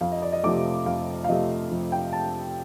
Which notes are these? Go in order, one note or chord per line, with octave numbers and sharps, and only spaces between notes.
F2 F5
D#5
D5
D#5
C3 F3 A3 D6
F2 F5
F5
C3 F3 A3 D#5
F2
G5
A5